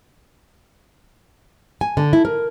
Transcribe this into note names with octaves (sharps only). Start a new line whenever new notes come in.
G#5
D3
E4
A#4